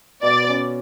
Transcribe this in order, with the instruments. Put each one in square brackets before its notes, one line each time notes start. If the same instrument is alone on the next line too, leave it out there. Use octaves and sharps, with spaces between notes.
[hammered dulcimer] B2 [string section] D5
[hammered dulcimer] C#4